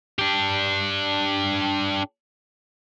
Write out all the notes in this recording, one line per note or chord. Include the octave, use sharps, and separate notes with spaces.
D4 G4